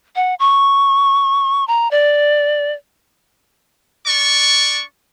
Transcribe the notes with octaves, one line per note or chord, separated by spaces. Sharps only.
F#5
C#6
A#5
D5
D4 D5 C#6